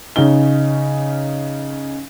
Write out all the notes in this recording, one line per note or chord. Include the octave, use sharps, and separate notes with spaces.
C#3 C#4 D#4 G7